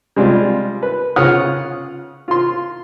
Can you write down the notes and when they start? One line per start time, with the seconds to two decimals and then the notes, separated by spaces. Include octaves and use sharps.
0.16 G3 G#3 C4 D4 F4
0.83 B4
1.16 C#3 F4 F#5 D#6 F6
2.28 F4 C6